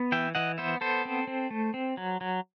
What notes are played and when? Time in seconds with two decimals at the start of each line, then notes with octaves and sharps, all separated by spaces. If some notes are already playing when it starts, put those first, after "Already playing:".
Already playing: B3
0.12 E3 E5 G5
0.35 E3 D#5 F#5
0.58 B3 C5 E5
0.81 B3 A4 C5
1.05 C4
1.27 C4
1.51 A3
1.74 C4
1.97 F#3
2.21 F#3